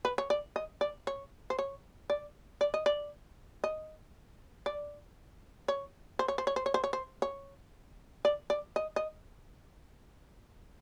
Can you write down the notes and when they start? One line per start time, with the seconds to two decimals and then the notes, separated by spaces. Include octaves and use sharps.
0.05 B4
0.18 C#5
0.30 D5
0.56 D#5
0.81 D5
1.07 C#5
1.50 C5
1.59 C#5
2.10 D5
2.61 D5
2.74 D#5
2.86 D5
3.64 D#5
4.66 D5
5.68 C#5
6.19 C5
6.28 C#5
6.38 C5
6.47 C#5
6.56 C5
6.66 C#5
6.74 C5
6.84 C#5
6.93 C5
7.22 C#5
8.25 D5
8.50 D5
8.76 D#5
8.96 D#5